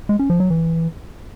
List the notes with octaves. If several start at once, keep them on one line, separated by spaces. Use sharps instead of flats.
G#3
C#4
F3
F#3
E3